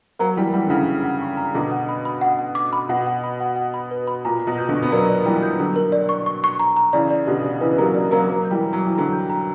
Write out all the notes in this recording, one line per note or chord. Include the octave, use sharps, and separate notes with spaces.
F#3 A#3 F#5
E3 G3 F#5
E3 G3 F#5
D3
C#3 E3 F#5
F#5
F#5
C#6
A#5
B2 D3 D6
F#5
B5
B5
F#5
F#5
D6
B5
B2 F#5
F#5
B5
F#5
F#5
B5
B4
B5
A#2 A#5
A#5
B2
G6
B2 D3
C#6
B3
F#3 A#3 D5
D5
E3 G3 A#5
G6
D3 F#3 A#5
A#4
D5
C#6
C#6
C#6
A#5
A#5
C#3 E3 D5
D5
B2 D3 G4
D5
C#3 E3 B4
F#3 A#3 G4
D5
F#3 A#3 D5
F#3 A#3 D6
G6
E3 G3
A#5
F#3
D6
E3
D3 F#3 A#5
G6
A#5